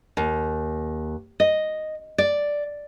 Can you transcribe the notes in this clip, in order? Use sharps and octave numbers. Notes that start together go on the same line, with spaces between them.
D#2
D#5
D5